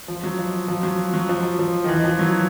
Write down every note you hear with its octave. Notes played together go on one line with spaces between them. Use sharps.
F3
F#3
F3
F3
F#3
F#3
F3
F3
D#3
E3
F3
F#3